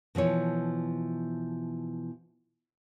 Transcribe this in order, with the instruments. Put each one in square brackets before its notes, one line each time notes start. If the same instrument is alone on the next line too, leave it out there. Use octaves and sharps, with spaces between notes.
[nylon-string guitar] B2 E3 F3 C#5